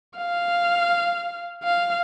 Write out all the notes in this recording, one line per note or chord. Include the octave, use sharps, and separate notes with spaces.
F5
F5